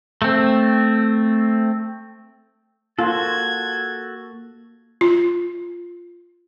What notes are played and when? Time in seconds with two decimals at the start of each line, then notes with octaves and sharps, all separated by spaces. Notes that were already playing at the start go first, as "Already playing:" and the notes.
0.22 A3 C4
2.99 A#3 F4 F#4 A4 G#6
5.01 F4